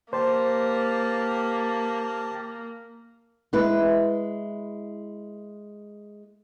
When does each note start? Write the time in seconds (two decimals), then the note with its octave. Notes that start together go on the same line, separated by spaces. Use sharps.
0.13 A#3 G4 C5 A5
3.53 G#3 E4 B4